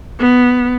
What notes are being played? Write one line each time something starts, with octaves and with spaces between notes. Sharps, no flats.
B3